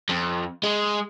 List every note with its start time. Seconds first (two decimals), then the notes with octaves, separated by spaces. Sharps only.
0.09 F2
0.63 G#3